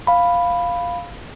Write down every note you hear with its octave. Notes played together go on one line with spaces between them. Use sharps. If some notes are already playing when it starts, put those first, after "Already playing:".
F5 B5